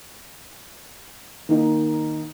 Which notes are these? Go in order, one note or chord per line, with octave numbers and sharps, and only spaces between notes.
D#3 A#3 D#4